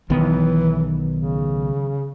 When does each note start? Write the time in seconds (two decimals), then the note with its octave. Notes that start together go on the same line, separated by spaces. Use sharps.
0.10 B1 D#3 E3 B3
1.16 C#3